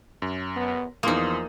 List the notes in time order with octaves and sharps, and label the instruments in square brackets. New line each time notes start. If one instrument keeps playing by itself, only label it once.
[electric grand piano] F#2
[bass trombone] B3
[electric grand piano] E2 C6 D#6 [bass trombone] F3 [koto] A#3 D#4